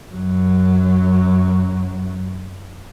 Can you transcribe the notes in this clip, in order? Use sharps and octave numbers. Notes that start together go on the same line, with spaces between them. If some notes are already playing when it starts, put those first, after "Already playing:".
F#2 F#3